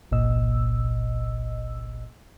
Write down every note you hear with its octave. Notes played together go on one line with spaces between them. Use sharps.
G1 C2 A#2 D#5 E6